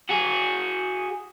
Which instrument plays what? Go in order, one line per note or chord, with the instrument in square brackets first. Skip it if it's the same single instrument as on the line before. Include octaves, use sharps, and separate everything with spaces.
[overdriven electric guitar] F#4 G#4